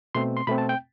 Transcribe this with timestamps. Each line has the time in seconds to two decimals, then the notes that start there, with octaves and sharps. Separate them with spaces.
0.15 B2 A3 C4 C6
0.37 C6
0.47 B2 A3 C4 B5
0.58 A5
0.69 G5